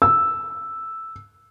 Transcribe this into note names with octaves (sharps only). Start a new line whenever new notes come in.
E6